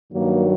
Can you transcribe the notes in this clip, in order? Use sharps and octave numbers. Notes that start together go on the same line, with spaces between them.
G2 D#3 F#3 A#3